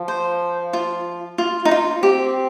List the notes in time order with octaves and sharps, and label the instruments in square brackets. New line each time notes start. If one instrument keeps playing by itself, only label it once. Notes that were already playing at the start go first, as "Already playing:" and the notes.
Already playing: [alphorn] F3
[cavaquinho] C5
F4
F4
D#4
F4
[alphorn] C4 [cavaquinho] G4